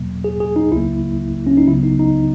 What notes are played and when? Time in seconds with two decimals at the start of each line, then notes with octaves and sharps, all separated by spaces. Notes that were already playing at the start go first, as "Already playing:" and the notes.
Already playing: E2 B2 F#3 A#3
0.24 G#4
0.40 G#4
0.56 D#4
0.72 C#2 C#3 F#3 A#3 E4
1.47 C#4
1.57 D#4
1.68 C#2 C#3 F#3 B3 E4
1.83 D#4
1.99 D#4